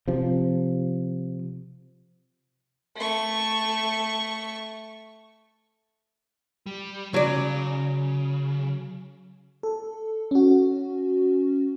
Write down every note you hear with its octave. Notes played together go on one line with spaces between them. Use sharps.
C3 F3
A3 C#6
G3
C#3 F#3 D5
A4
C#4 F#4